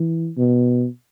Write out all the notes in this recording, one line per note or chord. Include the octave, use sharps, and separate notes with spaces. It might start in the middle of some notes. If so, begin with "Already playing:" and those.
Already playing: E3
B2